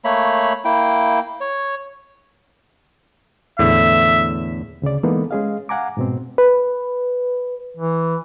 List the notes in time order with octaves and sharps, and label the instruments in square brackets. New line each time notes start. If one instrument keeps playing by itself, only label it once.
[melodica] A3 A#3 C#5 B5
A#3 E4 G5
C#5
[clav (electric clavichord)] E2 A2 D3 [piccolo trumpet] E5
[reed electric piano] D2 C#3 G#4 D5
E3 G#3 A#3 B3 D#4 A4
G#3 C#4 G#4 D#5 F5
F5 F#5 G#5 A#5 D6
G#2 B2 C4
[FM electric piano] B4
[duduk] E3